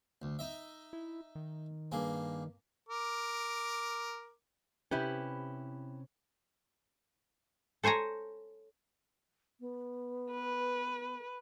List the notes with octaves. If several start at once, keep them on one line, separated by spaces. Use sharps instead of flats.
D2
D#4 D#5 E5
E4
D#3
G2 A#3 G#4
A#4 D6
C3 C#4 E4 G4 B4
A4 C5 C#5 G#5 A#5
B3
B4